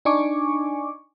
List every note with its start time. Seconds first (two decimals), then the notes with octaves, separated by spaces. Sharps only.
0.05 D4 D#4 G#5 C#6 D6